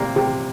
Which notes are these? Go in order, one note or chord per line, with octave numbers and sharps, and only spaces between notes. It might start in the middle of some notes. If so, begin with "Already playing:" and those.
Already playing: C3 G3 A#3
C3